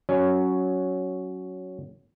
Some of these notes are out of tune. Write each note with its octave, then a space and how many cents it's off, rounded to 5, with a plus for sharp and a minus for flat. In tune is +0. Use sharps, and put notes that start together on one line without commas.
F#3 +0 C#4 +0